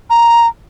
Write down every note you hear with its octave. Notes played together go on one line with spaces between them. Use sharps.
A#5